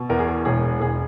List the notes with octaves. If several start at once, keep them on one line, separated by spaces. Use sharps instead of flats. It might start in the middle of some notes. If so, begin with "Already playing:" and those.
Already playing: B2
E2 A#4
G#4
A#4
E1 G#4
E1 G#4